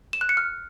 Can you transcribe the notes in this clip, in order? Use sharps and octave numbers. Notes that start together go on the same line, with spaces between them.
E7
F#6
C#7
F6